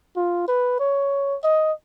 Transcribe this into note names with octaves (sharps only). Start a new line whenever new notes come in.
F4
B4
C#5
D#5